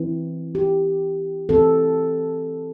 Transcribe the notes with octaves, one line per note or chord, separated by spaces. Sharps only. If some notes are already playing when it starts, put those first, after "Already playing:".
Already playing: E3 C4
G4
E3 C4 A4